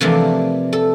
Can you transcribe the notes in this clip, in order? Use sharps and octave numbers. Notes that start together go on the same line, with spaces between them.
C3 E3 F3 A3 A#3 D4
A4